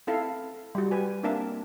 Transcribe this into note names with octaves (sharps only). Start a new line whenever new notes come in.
C4 E4 A4 F5
G3 F#4
G4 B4 G#5
A#3 C4 D4 A#4 E5 A5